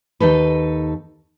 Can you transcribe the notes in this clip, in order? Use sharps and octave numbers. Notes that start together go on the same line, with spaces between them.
D#2 D#4 A4 B4